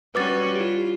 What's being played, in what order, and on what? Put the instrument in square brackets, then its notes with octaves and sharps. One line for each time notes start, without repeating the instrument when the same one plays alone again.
[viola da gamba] G3 C#4 F#4 [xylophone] B4 D6 A6
[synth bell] E4 G4 [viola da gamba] F4